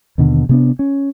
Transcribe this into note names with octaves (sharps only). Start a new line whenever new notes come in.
D#2 B2 D3
C3 B3 D4
C#4